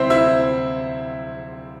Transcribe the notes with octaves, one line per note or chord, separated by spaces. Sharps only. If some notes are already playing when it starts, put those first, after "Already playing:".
Already playing: D2 C3 G3 C4 E4 C5 E5
E4 E5